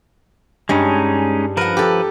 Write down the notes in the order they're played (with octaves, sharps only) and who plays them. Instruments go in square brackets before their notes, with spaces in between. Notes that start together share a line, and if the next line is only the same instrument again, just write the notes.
[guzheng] G2 [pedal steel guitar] G#3 C#4 D#4
[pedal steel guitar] F3 B4 [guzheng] A#4 F#5
[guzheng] G4 A4